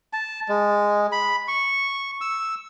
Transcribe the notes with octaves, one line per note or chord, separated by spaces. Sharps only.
A5
G#3
B5
C#6
E6